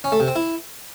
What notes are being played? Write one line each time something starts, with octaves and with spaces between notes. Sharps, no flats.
C#4
A3
C3
C4
E4